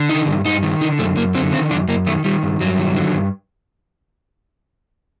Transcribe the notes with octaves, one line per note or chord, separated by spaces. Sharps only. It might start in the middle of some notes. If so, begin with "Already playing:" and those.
Already playing: D3
D#3 D#4
G2
G2 D#4
D#3
D3 D#4
F#2 A3
F#2 A#3
D3 C4
D#3 C4
F#2 D4
F#2 A#3
D#3 A3
D#3 G3
G2
G2 F#3
D#3
D3
G2